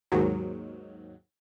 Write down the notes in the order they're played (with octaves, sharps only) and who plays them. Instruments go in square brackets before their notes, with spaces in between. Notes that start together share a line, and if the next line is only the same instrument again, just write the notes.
[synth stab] D#2 G#2 D#3 F#3